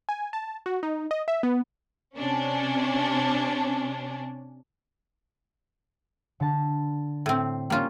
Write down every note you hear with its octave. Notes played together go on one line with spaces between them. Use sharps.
G#5
A5
F#4
D#4
D#5
E5
B3
C3 C#4 D4
D3 A5
A2 C4
G3 A#3 C#4 F4